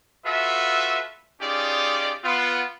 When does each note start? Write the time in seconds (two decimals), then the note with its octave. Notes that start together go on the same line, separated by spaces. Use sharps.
0.25 F4 F#4 A4 B4 E5
1.40 C#4 D#4 F4 G4 G#4 D5
2.24 B3 F4